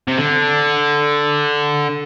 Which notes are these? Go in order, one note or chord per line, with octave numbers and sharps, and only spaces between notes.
C3
D3